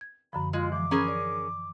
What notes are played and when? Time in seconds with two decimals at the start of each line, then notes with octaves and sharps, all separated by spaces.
0.01 G#6
0.33 F#2 D3 F3 B5
0.53 G#3 F4
0.72 E3 F3 D6
0.91 C#4 G#4 A#4 A#5 B5
1.08 D5